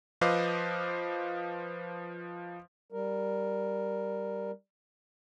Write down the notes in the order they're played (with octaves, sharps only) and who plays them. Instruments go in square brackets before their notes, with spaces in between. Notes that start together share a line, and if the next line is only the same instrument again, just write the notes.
[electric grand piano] F3 B4 C5 D#5 F5 D6
[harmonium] G3 A#4